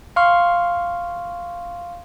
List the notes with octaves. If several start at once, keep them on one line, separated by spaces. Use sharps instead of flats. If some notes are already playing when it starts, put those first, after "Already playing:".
F5 C6 C#6 F6